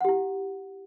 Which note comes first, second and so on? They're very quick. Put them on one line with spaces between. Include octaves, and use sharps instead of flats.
F#5 G4 E4